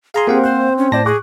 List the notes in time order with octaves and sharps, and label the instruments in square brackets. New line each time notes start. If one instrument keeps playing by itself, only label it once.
[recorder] G#4 [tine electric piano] F5 A#5 C6
[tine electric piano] A#3 F5 F#5 [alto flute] C4 [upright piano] G4 A#4 C5
[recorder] C5 [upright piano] F#6
[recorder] C#4
[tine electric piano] A2 A#6 [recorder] C5 [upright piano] D5 A5
[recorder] G#4 [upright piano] C#6 D6 F#6